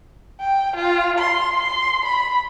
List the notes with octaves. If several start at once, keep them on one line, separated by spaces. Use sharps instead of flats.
G5
F4
C6
C6
B5